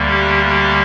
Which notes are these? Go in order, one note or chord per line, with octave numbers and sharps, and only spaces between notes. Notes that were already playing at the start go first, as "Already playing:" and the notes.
Already playing: D2 D3 G3 A#3
G4
G4